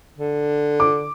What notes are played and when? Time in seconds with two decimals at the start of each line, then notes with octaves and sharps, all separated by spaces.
0.18 D3
0.80 D6